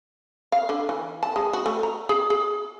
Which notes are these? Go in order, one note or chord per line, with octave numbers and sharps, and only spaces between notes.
F5
D3
E3
A5
G#3
F#4
A3
A#5
G#4
G#4